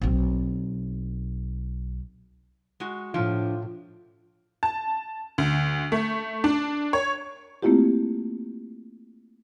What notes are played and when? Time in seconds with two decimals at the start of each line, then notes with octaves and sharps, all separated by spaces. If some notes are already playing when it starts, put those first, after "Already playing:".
0.02 B1 C4
2.80 G#3 F#4
3.14 A2 F3 D4 F4
4.63 A5
5.38 D2
5.92 A3
6.44 D4
6.93 C#5
7.62 A3 A#3 C4 E4 F4 G4